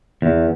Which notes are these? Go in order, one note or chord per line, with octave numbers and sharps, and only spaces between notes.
E2